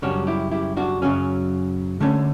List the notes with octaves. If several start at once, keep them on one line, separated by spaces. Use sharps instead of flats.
F#2 C#3 G3 C#4 D4 F#4
E4 G4
E4 G4
D4 F#4
F#2 C#3 F#3 C#4
D3 A3 C#4